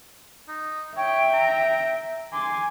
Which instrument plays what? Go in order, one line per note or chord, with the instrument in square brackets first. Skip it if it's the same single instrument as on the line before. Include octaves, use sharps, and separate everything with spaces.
[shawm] D#4
[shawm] C#5 [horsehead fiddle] E5 [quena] G5
[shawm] A#5
[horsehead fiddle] G#5 [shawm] C6 [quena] D6